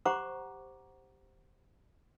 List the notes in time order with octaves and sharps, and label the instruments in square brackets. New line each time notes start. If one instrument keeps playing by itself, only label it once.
[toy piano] G4 C5 F#5 A#5 C#6 D6